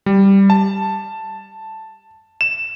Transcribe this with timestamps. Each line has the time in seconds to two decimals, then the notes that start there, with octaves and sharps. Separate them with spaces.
0.06 G3
0.50 A5
2.41 E7